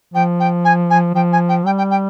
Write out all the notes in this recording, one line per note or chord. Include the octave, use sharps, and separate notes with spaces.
F3 G5
G5
G#5
G#5
F3 G5
G#5
G5
G3 G5
G5
G5